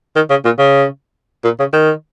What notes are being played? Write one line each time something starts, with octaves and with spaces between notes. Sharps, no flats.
D#3
C#3
A#2
C#3
A#2
C#3
D#3